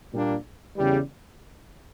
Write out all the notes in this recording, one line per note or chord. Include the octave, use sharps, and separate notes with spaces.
A#2 G3 A#3 D4
E2 C#3 E3 G3